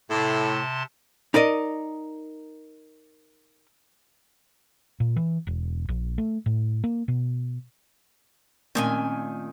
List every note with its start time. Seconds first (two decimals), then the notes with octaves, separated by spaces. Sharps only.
0.10 A2 C3 A5 C6
1.34 D#4 A#4 D5 D#5
5.00 A#2
5.16 E3
5.47 E1
5.89 A#1
6.18 A3
6.46 A2
6.84 A#3
7.08 B2
8.75 A#2 D#3 A3 C4 C#4 G#5